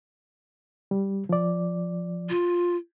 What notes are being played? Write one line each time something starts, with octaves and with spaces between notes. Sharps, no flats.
G3
F3 D5
F4